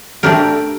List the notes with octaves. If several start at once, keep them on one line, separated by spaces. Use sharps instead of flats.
A3 D4 G4 A#4